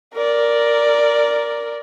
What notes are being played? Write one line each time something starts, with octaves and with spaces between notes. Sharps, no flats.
A#4 D5